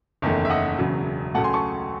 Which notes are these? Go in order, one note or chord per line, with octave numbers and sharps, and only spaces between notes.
F#1 E2 D#3 A3
E5
D#5 F#5
E1 E2 C#3 F#3
C#2 C#3 F#3 A3 F#5 A5
G#5 C6
A5 C#6